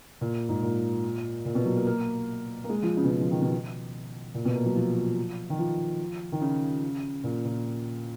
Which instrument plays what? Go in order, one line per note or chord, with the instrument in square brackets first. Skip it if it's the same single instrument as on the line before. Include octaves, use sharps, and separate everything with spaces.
[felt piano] A#2
G#2
A#2
A#2
B2
F#3
A#3
A#3
A#3
G#3
F3
C#3
B2
C#3
F3
D#3
B2
A#2
B2
A#3
F#3
F3
D#3
F3
D#3
C#3
A#2
A#2